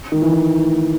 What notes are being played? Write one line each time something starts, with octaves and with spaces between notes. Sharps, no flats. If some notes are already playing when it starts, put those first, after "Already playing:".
D#3
E3
D#3